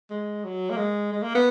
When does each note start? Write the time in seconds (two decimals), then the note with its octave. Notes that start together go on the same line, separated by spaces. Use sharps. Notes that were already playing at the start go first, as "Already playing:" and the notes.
0.10 G#3
0.44 F#3
0.70 A#3
0.77 G#3
1.12 G#3
1.22 A#3
1.35 B3